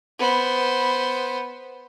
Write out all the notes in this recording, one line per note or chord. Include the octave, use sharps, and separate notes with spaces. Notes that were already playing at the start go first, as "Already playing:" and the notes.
B3 C5